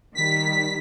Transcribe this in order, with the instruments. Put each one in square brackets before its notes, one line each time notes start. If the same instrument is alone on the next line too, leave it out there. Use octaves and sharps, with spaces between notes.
[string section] D#3 G3 [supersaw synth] B6